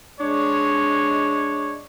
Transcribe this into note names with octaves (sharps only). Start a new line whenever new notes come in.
G#3 D4 C#5